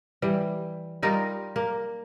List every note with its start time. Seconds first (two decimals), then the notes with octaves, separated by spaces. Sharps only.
0.22 E3 G3
1.02 G3 D#4 F4 A#4
1.56 A#3